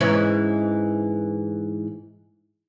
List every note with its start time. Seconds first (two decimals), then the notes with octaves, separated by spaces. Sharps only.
0.01 G#2 E3 C#4